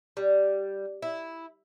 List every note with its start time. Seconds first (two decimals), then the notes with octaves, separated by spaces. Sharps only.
0.17 G3
1.02 E4